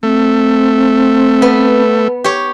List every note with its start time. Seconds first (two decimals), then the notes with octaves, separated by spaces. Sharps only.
0.03 A3 C4
1.42 B3
2.24 G4 C#5